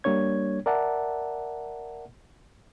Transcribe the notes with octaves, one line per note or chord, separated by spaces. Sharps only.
G3 A#3 D4 C#5 G#6
A#4 D5 E5 F#5 A5